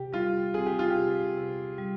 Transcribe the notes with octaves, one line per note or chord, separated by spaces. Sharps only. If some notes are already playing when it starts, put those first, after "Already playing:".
Already playing: C3 G4
G3 F4
C4 G#4
G4
F4
G4
C3
C3
G3